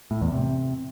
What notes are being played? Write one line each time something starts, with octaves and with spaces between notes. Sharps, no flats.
A2
E2
C3